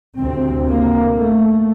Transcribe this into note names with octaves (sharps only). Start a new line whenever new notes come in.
D2 C3 C4
A#3
A3